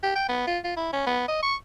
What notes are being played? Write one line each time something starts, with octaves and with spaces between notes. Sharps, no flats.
G4
G5
B3
F4
F4
E4
C#4
B3
D#5
C#6